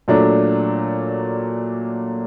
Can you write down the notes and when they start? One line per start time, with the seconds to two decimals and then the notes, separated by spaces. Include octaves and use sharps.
0.08 A#2 F#3 A3 D4